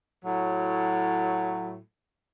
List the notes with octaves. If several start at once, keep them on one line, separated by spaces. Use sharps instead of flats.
A2 F#3